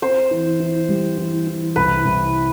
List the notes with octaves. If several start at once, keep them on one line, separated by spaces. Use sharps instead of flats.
C4 C5
E3
E3
G3
E3
E3
C2 B4
C2